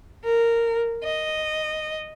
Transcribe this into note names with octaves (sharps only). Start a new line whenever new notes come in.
A#4
D#5